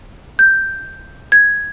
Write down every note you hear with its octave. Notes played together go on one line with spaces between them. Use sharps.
G6
G#6